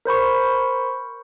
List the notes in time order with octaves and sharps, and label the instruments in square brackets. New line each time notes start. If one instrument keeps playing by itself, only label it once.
[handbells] A#4 C5 B5 C#6